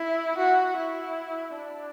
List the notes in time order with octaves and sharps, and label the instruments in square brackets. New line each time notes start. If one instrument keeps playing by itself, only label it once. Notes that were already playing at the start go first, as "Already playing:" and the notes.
Already playing: [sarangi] E4
F#4
E4
D4